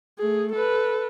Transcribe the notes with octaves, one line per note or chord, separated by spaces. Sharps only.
A3 G#4
A4 B4